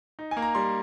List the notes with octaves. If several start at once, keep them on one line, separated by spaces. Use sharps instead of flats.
D#4
G#5
A#3
A#5
G3 C6